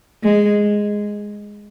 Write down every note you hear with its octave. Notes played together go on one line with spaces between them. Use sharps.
G#3